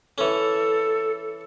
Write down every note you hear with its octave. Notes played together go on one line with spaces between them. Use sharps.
E3 C#4 A4